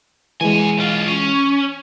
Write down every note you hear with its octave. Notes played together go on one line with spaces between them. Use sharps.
E3 G#3 B3 G#5
B1 F4
C#4